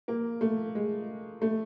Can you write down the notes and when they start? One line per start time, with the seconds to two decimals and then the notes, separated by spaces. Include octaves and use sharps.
0.08 A#3
0.41 A3
0.75 G#3
1.42 A3